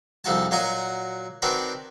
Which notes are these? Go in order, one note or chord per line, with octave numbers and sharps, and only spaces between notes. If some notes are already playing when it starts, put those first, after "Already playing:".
C2 F2 D#4 F#4 A5
A#2 F#3 F#4 D#5 A#5 D#6
D#3 C4 D4 F#4 A#4 B4